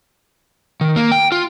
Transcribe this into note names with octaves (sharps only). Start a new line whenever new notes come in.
D#3
A#3
G5
F4